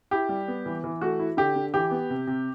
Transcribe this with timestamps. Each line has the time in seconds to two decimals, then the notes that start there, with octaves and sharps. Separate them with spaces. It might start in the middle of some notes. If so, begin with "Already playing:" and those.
0.11 E4 G4
0.29 G3
0.48 B3
0.66 E3
0.84 E3
1.01 A3 F#4
1.19 E4
1.37 D3 G4
1.56 D3
1.74 E3 G4
1.91 B3
2.10 C3
2.27 C3